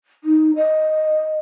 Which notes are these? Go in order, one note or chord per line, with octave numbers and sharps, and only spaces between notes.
D#4
D#5